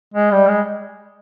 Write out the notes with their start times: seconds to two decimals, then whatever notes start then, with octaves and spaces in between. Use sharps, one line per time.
0.14 G#3
0.31 G3
0.48 G#3